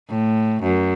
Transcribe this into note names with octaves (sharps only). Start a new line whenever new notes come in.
A2
F#2